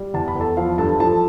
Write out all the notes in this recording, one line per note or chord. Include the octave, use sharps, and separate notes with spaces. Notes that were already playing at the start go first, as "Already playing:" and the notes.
Already playing: G3
E2 A5
B5
E2 A4 A5
F3 F5
G2 A4 A5
F3 A4 A5